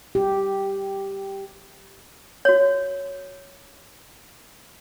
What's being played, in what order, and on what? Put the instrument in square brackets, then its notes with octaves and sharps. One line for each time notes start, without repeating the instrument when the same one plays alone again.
[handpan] G4
[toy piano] F#4 C#5